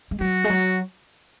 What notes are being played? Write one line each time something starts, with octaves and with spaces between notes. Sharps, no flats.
G#3
F#3 F#4
G#3
F#3